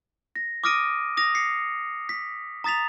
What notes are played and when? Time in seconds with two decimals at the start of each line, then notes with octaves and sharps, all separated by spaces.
0.36 A#6
0.64 D6 D#6 F6 A#6 D7 D#7
1.17 D#6 A#6 F7
1.35 A#6 C7 C#7
2.09 B6
2.64 A#5 D#6 A6 B6 F7